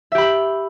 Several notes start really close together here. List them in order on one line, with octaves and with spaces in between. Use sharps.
E5 G4 B5